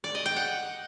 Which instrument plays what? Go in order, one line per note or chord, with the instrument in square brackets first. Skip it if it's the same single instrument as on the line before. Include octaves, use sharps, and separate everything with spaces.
[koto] D5
D#5
G5
F#5